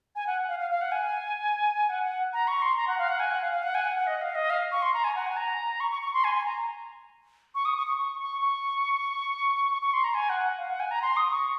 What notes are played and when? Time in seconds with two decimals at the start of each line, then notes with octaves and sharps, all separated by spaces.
0.15 G#5
0.27 F#5
0.48 F5
0.59 F5
0.70 F5
0.81 F#5
0.92 G#5
1.89 F#5
2.04 F#5
2.33 A#5
2.48 C#6
2.62 C6
2.77 A#5
2.87 F#5
2.98 F5
3.08 F#5
3.20 G#5
3.31 F#5
3.41 F5
3.52 F5
3.63 F#5
3.74 G#5
3.85 F#5
3.96 F#5
4.07 D#5
4.21 F5
4.35 D#5
4.50 F5
4.72 C#6
4.82 C6
4.94 A#5
5.04 G#5
5.15 F#5
5.26 G#5
5.37 A#5
5.80 C#6
5.91 C#6
6.02 C#6
6.13 C6
6.24 G#5
6.35 G#5
6.45 A#5
7.55 C#6
7.65 D#6
7.76 C#6
7.87 C#6
7.98 C#6
8.20 C#6
8.42 C#6
9.71 C#6
9.82 C#6
9.93 C6
10.04 A#5
10.14 G#5
10.29 F#5
10.58 F5
10.70 F#5
10.80 G#5
10.91 A#5
11.02 C6
11.17 D#6
11.30 C#6